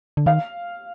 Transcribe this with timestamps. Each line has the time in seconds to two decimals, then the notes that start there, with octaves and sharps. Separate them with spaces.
0.17 D3
0.26 D#3 F5